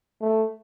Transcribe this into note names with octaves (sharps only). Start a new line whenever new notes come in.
A3